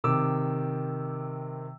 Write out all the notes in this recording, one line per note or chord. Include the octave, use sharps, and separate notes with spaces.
C3 D#3 D6 E6